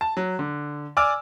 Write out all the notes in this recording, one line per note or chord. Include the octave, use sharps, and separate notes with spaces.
A5
F#3
D3
D5 G#5 D6 E6 F6